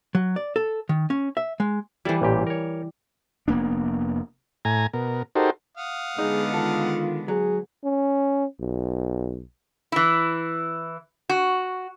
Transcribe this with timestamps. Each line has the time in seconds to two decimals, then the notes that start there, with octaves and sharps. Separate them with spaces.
0.15 F#3
0.36 D5
0.56 A4
0.89 D#3
1.10 C#4
1.37 E5
1.60 G#3
2.05 E3 G3 E4 A4 C5
2.22 A1 A#2 G4
2.47 A#4 C#5
3.48 F1 A#3 B3 D4
4.65 A2 G#5 A#5
4.93 B2 A#4
5.36 D#4 F#4 G4 A4 A#4 C5
5.77 F5 F#5 D#6
6.19 D3 G#3 B3 D#4 G#4
6.54 D#3 F4 A4
7.28 F#3 G#4
7.84 C#4
8.60 B1
9.92 E3 E4
11.29 F#4